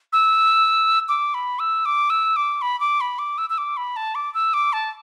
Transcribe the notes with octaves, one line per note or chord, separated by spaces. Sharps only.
E6
D6
B5
E6
D6
E6
D6
B5
D6
B5
D6
E6
E6
D6
B5
A5
D6
E6
D6
A5